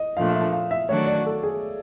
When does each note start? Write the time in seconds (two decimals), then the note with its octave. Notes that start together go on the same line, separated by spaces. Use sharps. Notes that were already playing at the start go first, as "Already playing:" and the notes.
Already playing: D#5
0.16 A#2 F3 A3 D4 F5
0.29 F5
0.35 E5
0.53 F5
0.71 E5
0.89 D#3 F#3 A3 D4 F#4 C#5
1.07 D5
1.26 A4
1.43 G#4